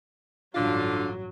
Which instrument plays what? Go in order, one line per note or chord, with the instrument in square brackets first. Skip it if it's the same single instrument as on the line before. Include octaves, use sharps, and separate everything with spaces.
[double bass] A1 G2 [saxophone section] D3 F4 [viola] F#3 [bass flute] D4